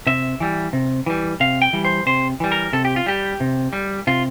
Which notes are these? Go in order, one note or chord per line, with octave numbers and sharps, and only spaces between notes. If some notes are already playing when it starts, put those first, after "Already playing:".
C3 E5
E3 G3
C3
E3 G3
C3 F5
G5
E3 G3
C5
C3 C5
E3 G3
A#4
C3 A4
G4
F4
G3 G4
C3
G3
C3 F4